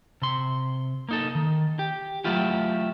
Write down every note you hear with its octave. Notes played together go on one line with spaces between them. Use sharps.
C3 C6
A#3 D#4 A4
D#3
G4
F#3 A3 E4 F4 G4